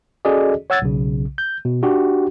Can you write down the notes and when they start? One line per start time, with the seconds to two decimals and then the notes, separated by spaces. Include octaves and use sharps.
0.25 C#4 F#4 G#4 A4 D5 D#5
0.70 C#5 F#5 E6 G#6 A6
0.82 B1 C#3
1.38 G6
1.65 B2
1.83 D4 F#4 G4